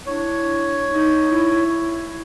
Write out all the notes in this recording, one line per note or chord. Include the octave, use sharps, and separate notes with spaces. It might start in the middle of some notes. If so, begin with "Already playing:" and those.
D4 E4 C#5
D#4
E4